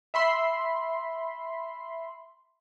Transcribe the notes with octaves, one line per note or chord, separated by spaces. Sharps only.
E5 B5 C6